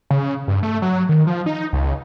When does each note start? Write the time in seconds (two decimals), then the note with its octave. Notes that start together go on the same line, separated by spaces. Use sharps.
0.10 C#3
0.48 G2
0.63 A3
0.82 F#3
1.09 D#3
1.27 F3
1.46 D#4
1.73 C#2